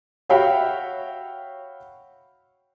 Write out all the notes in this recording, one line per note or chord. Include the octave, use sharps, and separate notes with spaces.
F#4 C#5 E5 F5 G5 B5